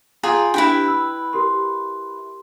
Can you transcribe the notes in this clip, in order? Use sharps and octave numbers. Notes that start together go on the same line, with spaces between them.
F4 G#4 G5 A#5 D6 D#6
D4 E4 G4 B4 G5
E6
G4 A#4 C6